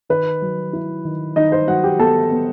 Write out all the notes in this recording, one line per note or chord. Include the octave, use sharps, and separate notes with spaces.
D#3 B4
F#3
E4
D#3
D#3 D#4 D#5
C5
F#3 F#4 F#5
G4 G5
B3 A4 A5
B3